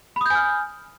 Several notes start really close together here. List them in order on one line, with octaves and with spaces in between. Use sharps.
B5 D#6 G6 G#5 F6